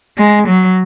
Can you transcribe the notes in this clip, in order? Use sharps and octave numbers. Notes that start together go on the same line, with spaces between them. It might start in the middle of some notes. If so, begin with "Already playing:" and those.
G#3
F#3